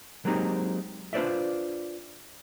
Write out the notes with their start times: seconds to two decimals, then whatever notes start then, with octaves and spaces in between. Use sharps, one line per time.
0.25 F#3 G#3 A#3 C4 D#4 G4
1.13 D4 F4 B4 C5 D5 E5